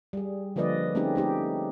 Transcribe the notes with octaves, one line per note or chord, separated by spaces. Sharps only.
G3 G#4
D3 F3 A#3 B4 D5 D#5
A3 C4 C#4 D#4 G4 G#4
A3 D#4 G4